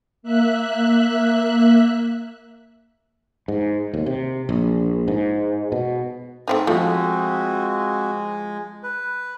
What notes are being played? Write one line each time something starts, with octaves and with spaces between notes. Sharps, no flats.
A#3 E5 F#6
G#2
D#2
C3
A#1
G#2
B2
G#2 A3 C4 D#4
F3 G#3 A3 C4 F#4
B4